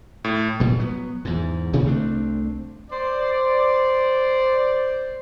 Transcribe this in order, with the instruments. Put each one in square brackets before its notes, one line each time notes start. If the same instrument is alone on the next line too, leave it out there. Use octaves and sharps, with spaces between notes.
[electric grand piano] A2
[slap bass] A1 A#2 G3
F#3 B3
E2 G#2
G#1 C3 D#3 F3
C2 A3 C4 D4
[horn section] C5 D5